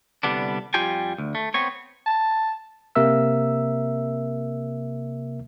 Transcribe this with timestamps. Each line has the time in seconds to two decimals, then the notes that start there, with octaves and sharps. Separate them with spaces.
0.23 C2 D3 G3 B3 D4
0.74 F2 G3 F4 G4 G5 G#5
1.18 D2
1.35 A3
1.54 B3 C4 C#5
2.06 A5
2.95 C3 A#3 A#4 E5 E6